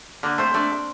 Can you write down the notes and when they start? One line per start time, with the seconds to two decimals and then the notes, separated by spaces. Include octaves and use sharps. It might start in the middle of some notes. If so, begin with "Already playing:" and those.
0.23 D3 A#3 A#4
0.38 A3 C4 C5
0.54 A3 D4 D5